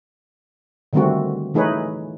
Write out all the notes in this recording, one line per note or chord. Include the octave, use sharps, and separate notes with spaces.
D3 D#3 G3 A3 C4 F#4
E3 A3 D#4 G#4 B4 C#5